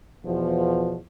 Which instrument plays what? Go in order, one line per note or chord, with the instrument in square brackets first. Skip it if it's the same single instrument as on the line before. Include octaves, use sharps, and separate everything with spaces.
[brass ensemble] E2 B2 F3